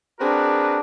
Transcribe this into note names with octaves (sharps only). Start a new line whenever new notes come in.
C4 D4 F#4 G#4 A#4 B4